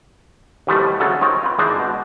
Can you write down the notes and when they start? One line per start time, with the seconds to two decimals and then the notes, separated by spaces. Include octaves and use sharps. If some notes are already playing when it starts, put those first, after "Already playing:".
0.67 D#2 B2 E3 F3 G3 A3
1.00 D2 C#3 F#3 A4
1.21 C4 D#4 F4 A#4 C#5
1.43 F4 B4
1.59 G#1 E3 D4 D#4 C5
1.80 B2